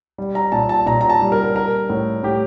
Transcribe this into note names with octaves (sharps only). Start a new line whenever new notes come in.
G3
A#5
A#2 A5
A5
A#2 A#5
A#5
A5
G3
A#4
G3 A#4
A2
A2 G4